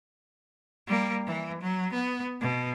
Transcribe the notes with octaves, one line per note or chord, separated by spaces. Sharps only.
G3 A#3
E3
F#3
B3
B2